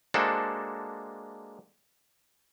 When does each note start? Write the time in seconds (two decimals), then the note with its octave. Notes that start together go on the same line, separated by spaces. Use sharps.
0.14 G#3 A#3 D4 F#4 A4 C5